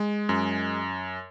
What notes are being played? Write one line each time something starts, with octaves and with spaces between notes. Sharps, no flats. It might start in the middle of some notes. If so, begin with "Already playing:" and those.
Already playing: G#3
F#2